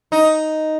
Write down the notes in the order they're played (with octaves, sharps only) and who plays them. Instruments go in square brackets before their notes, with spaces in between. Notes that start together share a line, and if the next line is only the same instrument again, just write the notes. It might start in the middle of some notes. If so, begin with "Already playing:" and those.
[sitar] D#4